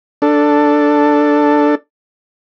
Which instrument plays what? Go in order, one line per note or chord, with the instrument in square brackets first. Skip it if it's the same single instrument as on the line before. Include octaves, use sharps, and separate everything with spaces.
[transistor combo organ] D4 A4